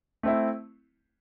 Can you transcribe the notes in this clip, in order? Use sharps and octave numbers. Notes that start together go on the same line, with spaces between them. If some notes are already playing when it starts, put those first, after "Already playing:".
A3 C4 E4